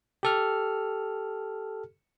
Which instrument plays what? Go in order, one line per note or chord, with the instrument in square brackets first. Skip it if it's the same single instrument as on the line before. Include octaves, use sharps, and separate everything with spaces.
[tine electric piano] G4 A4 F6